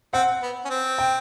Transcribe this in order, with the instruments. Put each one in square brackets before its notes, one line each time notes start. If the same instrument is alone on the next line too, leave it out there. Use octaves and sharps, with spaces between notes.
[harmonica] C4 [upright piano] F#5
[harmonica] B3
C#4
C4
[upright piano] G5